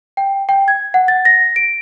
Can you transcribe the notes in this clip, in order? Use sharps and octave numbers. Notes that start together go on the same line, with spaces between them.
G5
G5
G#6
F#5
A6
A#6
D7